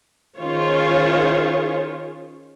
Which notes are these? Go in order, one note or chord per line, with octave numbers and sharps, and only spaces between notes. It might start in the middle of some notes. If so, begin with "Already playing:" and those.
D#3 C#4 F4 G#4 C5 C#5